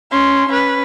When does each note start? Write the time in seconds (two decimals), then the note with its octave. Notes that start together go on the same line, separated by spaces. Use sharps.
0.11 C#4 C6
0.48 C#4 B4